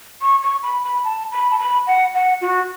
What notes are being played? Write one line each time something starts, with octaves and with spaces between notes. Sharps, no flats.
C#6
C#6
B5
B5
A5
B5
A5
B5
F#5
F#5
F#4